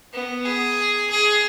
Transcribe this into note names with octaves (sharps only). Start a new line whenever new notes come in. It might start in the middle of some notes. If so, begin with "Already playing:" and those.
B3
G#4
G#4